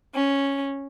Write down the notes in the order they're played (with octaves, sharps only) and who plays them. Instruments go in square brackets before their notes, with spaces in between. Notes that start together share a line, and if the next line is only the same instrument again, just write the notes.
[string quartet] C#4